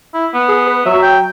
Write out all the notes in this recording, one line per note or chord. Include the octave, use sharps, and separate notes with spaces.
E4
B3
G#4
B4
F#3 E5
G5